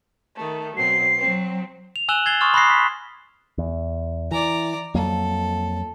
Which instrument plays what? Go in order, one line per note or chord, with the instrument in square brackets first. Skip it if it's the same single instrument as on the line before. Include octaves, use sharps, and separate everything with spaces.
[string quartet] D#3 A3
[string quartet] B2 F#3 C4 [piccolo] C7
[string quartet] F#3 C4
[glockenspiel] F7
G#5 E6 F#6 E7 F#7 G7
E6 G#6 A6 C7 G7
C6 C#6 D#6 F6 A6
B5 C6 D#6 F#6 A#6 C7
B6
[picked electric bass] E2
[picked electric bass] E3 [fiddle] D5 A#5
[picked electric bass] F2 F#3 A#3 [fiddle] A4